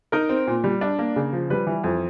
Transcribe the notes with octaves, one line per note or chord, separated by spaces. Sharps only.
D#4 A#4
C4
A#2
G3
D4
A#3
C#3
F3
G3 B4
E3
F2